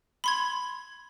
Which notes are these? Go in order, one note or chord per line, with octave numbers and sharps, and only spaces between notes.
B5 C6 G#6